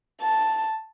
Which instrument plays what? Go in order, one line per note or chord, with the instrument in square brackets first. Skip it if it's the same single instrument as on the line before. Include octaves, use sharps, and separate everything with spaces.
[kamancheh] A5